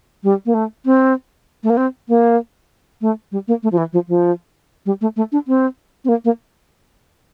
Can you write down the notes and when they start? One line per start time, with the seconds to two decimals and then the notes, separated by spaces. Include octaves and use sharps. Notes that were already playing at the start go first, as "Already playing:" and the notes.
0.23 G3
0.46 A#3
0.54 A3
0.85 C4
1.63 A3
1.70 A#3
1.77 C4
2.09 A#3
3.01 A3
3.32 G3
3.48 A#3
3.63 A3
3.72 F3
3.78 E3
3.93 F3
4.08 F3
4.86 G3
5.01 A3
5.16 A3
5.32 D4
5.48 C4
6.05 C4
6.09 A#3
6.25 A#3